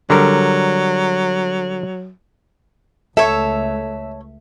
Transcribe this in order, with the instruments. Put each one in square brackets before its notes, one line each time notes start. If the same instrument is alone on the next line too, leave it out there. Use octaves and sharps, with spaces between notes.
[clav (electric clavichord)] D3 G3 A#4 [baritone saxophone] F#3
[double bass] C#2 A3 [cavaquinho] A4 C#5 [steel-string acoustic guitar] E5